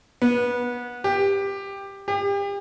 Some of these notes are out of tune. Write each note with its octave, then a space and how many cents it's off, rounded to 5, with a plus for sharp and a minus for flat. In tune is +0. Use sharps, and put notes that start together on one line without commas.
B3 -25
G4 +10
G4 +35